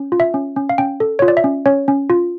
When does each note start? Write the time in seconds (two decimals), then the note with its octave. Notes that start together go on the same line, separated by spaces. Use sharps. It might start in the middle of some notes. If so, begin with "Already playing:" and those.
Already playing: C#4
0.12 F4
0.20 E5
0.34 C#4
0.56 C#4
0.69 F5
0.78 C#4 G5
1.00 A4
1.19 F4 C#5
1.28 D5
1.37 E5
1.44 C#4
1.66 C#4 C#5
1.88 C#4
2.10 F4